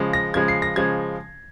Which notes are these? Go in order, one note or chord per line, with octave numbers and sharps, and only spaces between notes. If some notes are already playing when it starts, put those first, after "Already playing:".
Already playing: C#3 F3 G#3
A#6
C#3 F3 G#3 G#6
C7
A#6
C#3 F3 G#3 G#6